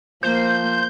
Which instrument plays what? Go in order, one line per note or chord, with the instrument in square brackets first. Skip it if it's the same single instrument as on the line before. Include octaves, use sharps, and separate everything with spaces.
[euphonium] F3 [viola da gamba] A#3 [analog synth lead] C5 [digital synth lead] G6